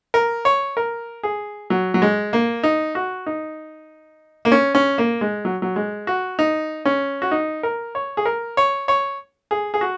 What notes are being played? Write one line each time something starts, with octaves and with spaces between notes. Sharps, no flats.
A#4
C#5
A#4
G#4
F#3
F#3
G#3
A#3
D#4
F#4
D#4
A#3
C#4
C#4
A#3
G#3
F#3
F#3
G#3
F#4
D#4
C#4
F#4
D#4
A#4
C#5
G#4
A#4
C#5
C#5
G#4
G#4
F#4